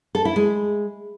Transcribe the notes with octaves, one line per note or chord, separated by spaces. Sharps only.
A4
E4
G#3